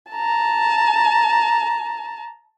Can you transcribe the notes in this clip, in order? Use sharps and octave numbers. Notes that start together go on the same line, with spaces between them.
A5 A#5